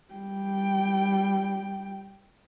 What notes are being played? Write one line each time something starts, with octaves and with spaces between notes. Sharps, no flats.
G3 G5